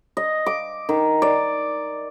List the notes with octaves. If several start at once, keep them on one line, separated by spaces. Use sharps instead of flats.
D#5
D6
D#3
D5